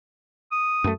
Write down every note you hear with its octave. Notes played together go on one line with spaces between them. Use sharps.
D#6
F#2 A3